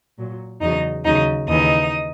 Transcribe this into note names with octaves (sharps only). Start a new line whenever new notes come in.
A#2 F#3
E2 C#3 F#3 D#4 D#5
D#2 C#3 F#3 D#4 D#5
D#2 C#3 E3 D#4 D#5